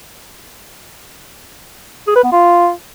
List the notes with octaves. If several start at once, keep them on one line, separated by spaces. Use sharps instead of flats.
G#4
B4
B3
F4